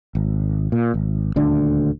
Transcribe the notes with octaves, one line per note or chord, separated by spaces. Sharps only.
G#1
A#2
G#1
D#1 D2 D3 D4